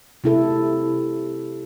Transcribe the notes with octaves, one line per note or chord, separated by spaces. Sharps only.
C3 E4 A4